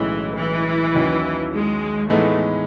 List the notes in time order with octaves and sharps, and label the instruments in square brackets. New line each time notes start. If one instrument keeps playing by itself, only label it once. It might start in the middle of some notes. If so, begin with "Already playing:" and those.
Already playing: [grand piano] B1 A2 G#3 C#4 [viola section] E3
[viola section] E3
[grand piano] D#2 D#3 F#3 C#4 E4
[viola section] G#3
[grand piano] A2 E3 G#3 B3 D#4 [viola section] A3